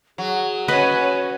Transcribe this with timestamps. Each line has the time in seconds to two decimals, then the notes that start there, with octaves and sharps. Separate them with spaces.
0.18 F#3 G#4
0.68 C#4 F#4 B4 C#5 D#5